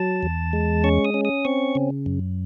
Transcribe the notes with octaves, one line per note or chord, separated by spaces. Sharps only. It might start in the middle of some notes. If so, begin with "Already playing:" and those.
Already playing: F#3 A5
E2
G#3
C#4 C#6
D#6
C#4
D#6
C4 C#6
C#3
F#2